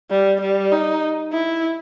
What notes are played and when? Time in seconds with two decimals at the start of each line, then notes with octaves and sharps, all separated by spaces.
0.11 G3
0.41 G3
0.72 D#4
1.33 E4